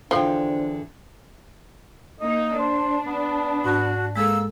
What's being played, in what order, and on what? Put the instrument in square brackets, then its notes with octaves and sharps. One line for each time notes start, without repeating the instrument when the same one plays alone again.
[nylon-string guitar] E2 D3 G5 [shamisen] F3 [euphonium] D4 [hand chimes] C5
[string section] A#3 D#4 [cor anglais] D#5
[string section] D4 [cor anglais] C5
[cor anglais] B3
[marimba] G#2 A5 [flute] F#4
[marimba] G#3 G#4 A4 [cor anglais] A#3 [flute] E6